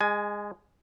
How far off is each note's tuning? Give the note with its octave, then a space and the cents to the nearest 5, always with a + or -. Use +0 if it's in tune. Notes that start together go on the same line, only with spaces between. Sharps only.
G#3 -15 G#5 +20